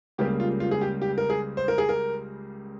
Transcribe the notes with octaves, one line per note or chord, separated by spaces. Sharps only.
C#2 C#3 G3 A#3 G4
F4
F4
G#4
G4
G4
A#4
G#4
C5
A#4
G#4
A#4